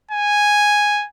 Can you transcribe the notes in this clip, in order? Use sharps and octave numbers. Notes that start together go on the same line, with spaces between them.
G#5